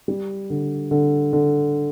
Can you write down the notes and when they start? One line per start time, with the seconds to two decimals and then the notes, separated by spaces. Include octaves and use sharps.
0.08 G3
0.50 D3
0.91 D3
1.33 D3